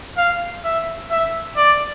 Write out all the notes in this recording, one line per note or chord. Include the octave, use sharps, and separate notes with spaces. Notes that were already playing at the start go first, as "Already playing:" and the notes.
F5
E5
E5
D5